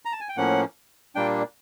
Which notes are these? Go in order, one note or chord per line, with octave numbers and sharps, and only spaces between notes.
A#5
A5
G#5
G5
A2 F3 A#3 C#4 F#5
A#2 G3 A#3 D4 G5